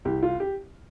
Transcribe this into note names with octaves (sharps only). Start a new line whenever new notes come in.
C2 G4
F4
G4